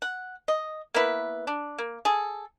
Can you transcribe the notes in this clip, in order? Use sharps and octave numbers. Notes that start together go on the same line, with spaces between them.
F#5
D#5
A#3 B3 E4 B4
D4
A#3
G#4 A4